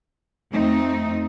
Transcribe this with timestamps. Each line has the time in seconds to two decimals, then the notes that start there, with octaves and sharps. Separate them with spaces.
0.52 F2 A3 C4 D#4